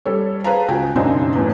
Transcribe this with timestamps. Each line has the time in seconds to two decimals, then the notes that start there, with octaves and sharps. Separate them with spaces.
0.06 G3 A4 C#5
0.44 G#4 B4 C5 F5 A5 A#5
0.68 C#2 C#3 F#4 G5 G#5
0.96 E1 F#2 C#3 C4 D4 D#4
1.35 E2 A2